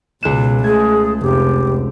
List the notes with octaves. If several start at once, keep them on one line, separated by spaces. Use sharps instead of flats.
C#2 B2 F#6 E7
A3 G#4 G#6
F1 G4